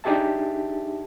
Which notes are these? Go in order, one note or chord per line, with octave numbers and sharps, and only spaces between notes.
D4 D#4 G4 G#4 E5 A5